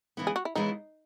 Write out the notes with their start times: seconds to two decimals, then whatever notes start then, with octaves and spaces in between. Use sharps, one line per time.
0.17 C#3 E3 G#3 B3 E4
0.27 G#4
0.36 F#4
0.45 E4
0.55 C#3 E3 G#3 B3 D#4 E4